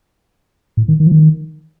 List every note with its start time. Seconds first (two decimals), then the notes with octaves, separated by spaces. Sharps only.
0.77 A2
0.88 D#3
1.00 D#3
1.07 F3
1.12 D#3